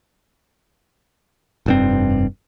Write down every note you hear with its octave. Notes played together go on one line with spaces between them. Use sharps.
F1 G2 C4